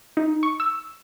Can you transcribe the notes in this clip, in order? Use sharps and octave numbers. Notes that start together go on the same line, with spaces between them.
D#4
C#6
E6